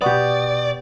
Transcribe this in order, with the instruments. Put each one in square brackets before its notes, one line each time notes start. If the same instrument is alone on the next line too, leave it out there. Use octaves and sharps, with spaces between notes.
[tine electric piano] B2 C#6 D#6 [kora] B3 G4 [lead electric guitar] D5